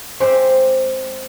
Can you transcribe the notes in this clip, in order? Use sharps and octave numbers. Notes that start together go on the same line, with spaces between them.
G#3 C4 G4 C5